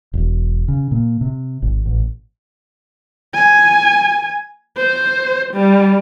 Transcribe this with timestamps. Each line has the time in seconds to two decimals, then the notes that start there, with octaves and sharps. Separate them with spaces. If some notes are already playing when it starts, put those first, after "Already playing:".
0.13 E1
0.68 C#3
0.91 A#2
1.21 C3
1.62 G#1
1.86 A1
3.34 G#5
4.77 C5
5.54 G3